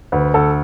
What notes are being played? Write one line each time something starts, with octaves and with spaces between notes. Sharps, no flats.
D2 B4
D2 A4